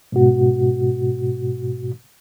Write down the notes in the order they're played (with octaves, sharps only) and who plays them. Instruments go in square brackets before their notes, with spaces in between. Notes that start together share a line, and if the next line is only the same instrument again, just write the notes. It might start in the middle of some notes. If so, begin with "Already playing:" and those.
[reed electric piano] G#2 B2 F#4